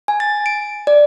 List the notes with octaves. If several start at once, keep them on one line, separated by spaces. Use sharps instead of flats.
G#5
A6
D7
D5